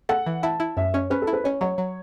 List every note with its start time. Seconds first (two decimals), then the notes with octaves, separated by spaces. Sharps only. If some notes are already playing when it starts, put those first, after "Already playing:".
0.09 A4 F#5
0.26 E3
0.43 E4 A5
0.60 E4
0.77 F#2 E5
0.94 C#4 C#5
1.10 C#4 B4
1.22 A4
1.27 E4
1.33 B4
1.44 C#4 C#5
1.61 F#3 C#5
1.78 F#3